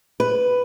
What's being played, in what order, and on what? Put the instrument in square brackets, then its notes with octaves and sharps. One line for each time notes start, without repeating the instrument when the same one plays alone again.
[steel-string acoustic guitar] B4